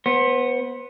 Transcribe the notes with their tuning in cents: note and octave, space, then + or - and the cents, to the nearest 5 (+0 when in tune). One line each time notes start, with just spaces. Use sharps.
B3 -5 C5 +25